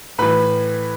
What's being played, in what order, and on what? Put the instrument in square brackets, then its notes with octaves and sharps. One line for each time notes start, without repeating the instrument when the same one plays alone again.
[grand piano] A2 E3 B4